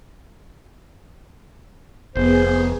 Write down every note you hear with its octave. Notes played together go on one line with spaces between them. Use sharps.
F1 B3 G#4 C5